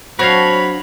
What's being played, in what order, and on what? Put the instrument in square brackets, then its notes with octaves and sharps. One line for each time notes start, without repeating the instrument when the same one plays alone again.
[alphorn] F#3 [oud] C4 D4 [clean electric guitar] F#4 C#5 F5 [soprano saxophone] B5